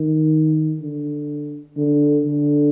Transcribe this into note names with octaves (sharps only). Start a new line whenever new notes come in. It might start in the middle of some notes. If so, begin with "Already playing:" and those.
Already playing: D#3
D3
D3
D3